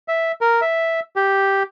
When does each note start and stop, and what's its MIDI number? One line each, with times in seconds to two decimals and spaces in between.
0.08 0.32 76
0.41 0.61 70
0.61 1.00 76
1.16 1.63 67